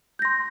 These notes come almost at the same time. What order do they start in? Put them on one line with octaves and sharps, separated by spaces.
G6 A#6 C6